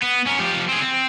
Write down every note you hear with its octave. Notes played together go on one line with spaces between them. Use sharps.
B3
C#4 A#4
F3 G4
C4 G#4
C4